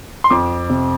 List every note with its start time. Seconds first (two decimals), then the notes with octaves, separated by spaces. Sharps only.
0.24 C6
0.30 F2 D6
0.70 C3